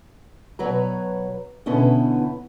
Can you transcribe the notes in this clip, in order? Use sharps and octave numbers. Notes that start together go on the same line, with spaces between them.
B2 F#3 B4 C#5 A#5
B2 D3 B3 C#4 D#4 E4